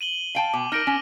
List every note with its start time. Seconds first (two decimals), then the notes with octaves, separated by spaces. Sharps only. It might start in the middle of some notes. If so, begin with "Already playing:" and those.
0.01 D#7 F#7 G7
0.35 F5 G5 A5
0.54 B2 D6
0.72 D#4 A#4 F6 A#6 D7
0.87 C#4